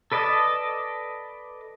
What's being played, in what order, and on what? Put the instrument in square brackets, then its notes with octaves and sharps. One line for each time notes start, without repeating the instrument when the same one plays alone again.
[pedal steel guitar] A4 B4 D5 D#5 A5